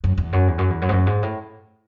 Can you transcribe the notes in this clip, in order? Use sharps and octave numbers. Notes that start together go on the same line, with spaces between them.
F#2
E2
F#2
E2
F#2
E2
F#2
G#2
F#2
G#2
A2